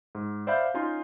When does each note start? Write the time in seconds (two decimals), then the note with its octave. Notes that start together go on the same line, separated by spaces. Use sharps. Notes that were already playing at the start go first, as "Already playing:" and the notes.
0.15 G#2
0.47 C5 D5 E5 F5 B5 G6
0.74 C#4 D#4 F4 G#5 C6